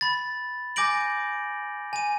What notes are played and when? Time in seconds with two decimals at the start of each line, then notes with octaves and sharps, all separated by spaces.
0.01 B5 A6
0.76 G#5 D6 G6 A#6 D7 F#7
1.93 G#5 D#7